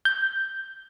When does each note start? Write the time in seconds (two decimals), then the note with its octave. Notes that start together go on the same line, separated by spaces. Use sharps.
0.05 G6